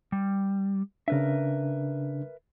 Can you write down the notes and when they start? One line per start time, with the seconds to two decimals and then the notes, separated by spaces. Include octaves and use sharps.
0.12 G3
1.08 C#3 D4 A#4 B4 E5